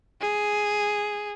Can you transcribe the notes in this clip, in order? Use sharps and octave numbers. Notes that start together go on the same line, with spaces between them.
G#4